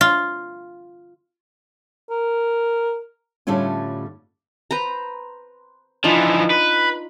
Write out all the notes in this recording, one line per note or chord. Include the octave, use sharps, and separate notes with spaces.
F4
A#4
A2 D3 G3 A3 C#4 F4
B4 C5 A#5
E3 F3 D4 D#4 F4
B4